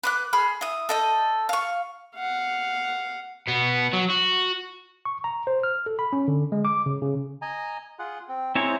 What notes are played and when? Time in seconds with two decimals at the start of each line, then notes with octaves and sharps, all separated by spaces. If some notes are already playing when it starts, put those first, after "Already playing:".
0.03 B4 D6 F#6
0.33 G#4 B5 C6 F6
0.61 E4 D#6
0.89 A4 D#5 G6
1.49 F5 C#6
2.15 F5 F#5
3.48 B2 B3
3.93 F#3
4.10 F#4
5.05 C#6
5.24 A#5
5.47 C5
5.63 F6
5.86 A4
5.99 B5
6.13 C#4
6.28 D3
6.52 G#3
6.65 D6
6.86 C#3
7.02 C#3
7.42 D#5 G#5 A#5
7.99 F4 G#4 F#5
8.29 C4
8.55 G#3 C4 E4 G#4 C#5 A#5